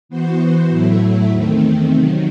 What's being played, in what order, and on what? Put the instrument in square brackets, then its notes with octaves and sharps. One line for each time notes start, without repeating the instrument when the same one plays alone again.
[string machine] E3 B3 F#4 C5
A2 F#3 A3 E4
E2 D#3 A3 C4
C3 D#3 F#3